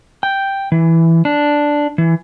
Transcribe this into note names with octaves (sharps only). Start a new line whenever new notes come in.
G5
E3
D4
E3